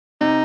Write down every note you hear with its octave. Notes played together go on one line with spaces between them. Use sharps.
C3 D#4